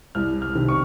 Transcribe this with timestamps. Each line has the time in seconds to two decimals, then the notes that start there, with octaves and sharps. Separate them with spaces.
0.15 C2 F6
0.42 F6
0.55 C3 D#3
0.68 C#6